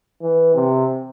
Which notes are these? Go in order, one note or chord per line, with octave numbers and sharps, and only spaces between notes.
E3
C3